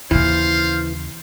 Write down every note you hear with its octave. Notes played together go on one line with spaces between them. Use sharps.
D#2 C#3 E3 F4 C5 F5